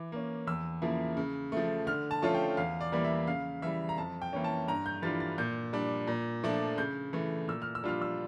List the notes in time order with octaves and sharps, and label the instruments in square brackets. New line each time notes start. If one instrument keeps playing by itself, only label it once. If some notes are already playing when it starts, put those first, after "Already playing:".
Already playing: [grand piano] E3 D6
A#3 C#4
E2 E6
C#3 F3 A#3 E4
C#3
F3 A3
D3 F6
A5
F3 A3 C#4 F4 A5
G5
E2 F5
D5
E3 G3 A#3 D5
E5
C#3 F5
E3 G3 E5
A#5
F2 A5
G5
E3 A#3 C#4
A5
G2 A#5
G6
E3 G3 D4 F4 A6
A6
A#2 G6
G3 D4
A#2
F3 A3 D4
C#3 G6
E3 A3
A#2 E6
F6
E6
G3 D4 F4 F6
E6